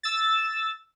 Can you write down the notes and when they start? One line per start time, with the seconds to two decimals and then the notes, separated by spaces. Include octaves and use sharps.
0.03 E6 A6